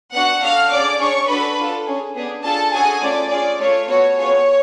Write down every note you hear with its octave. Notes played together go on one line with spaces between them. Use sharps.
B3 D4 F#4 F#5 F#6
D4 F#4 A4 F5 F6
C#4 G#4 D5 D6
D4 G#4 C#5 C#6
D4 F#4 A4 B4 B5
D4 F4 A4
C#4 G#4
B3 D4 G#4
D4 F4 G#4 A4 A5
C#4 F#4 G#4 A4 G#5
A3 C#4 F4 D5
C#4 F4 G#4 D5
A3 F4 A4 C#5
B3 F#4 A4 C#5
B3 F4 G#4 C#5